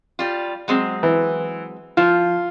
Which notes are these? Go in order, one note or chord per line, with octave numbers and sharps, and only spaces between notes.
G3 F4
F#3 G#3 C4
E3
F3 F4